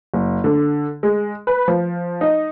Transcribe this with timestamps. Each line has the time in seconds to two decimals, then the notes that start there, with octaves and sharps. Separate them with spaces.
0.14 F#1
0.44 D3
1.03 G#3
1.47 B4
1.68 F3
2.21 D#4